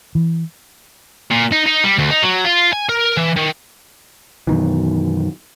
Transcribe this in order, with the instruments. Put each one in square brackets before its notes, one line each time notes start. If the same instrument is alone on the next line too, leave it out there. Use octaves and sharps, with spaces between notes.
[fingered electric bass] E3
[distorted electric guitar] A#2
D#4
D#4
G3
D2
D#4
F#3
F4
G#5
A#4
E3
D#3
[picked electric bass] F#2 B2 D#3 E3